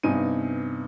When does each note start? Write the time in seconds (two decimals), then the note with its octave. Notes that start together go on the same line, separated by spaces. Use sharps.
0.03 G2 C3 B3 D#4 G#5 D#7